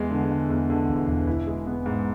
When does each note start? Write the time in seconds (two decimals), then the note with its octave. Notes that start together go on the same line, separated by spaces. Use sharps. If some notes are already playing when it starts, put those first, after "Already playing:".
Already playing: E2 G#3
0.11 D3
0.30 D3
0.50 E2
0.70 D3
0.89 E1
1.08 E1
1.27 E4
1.47 G#3
1.67 B3
1.86 G#2